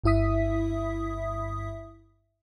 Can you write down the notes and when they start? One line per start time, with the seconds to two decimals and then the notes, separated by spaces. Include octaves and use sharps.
0.04 G1 G2 E4 E5 D#6 B6